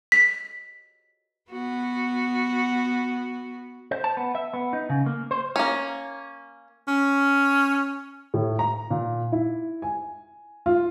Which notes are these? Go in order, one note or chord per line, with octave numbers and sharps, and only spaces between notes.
B6
B3 F#4
C5
A5
B3
E5
B3
D#4
C#3
A#3
C5
A#3 C#4
C#4
A2
A#5
A#2
E4
G#5
F4